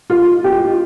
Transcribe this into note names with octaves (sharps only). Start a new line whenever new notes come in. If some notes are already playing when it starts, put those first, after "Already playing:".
F4
G4